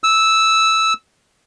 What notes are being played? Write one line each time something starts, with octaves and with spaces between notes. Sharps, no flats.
E6